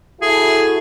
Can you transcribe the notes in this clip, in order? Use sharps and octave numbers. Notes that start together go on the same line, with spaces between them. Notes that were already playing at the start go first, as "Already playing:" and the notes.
E4 F#4 G#4 A4